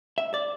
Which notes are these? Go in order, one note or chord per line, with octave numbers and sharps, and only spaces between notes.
E5
D5